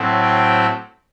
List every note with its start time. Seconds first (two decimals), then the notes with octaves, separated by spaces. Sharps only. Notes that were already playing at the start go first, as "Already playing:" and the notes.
Already playing: A2 F#3 A3 C4
0.22 G5